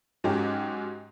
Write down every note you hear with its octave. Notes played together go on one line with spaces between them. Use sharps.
G#2 F#3 G#3 C#4 G4